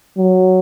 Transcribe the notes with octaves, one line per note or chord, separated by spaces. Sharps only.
F#3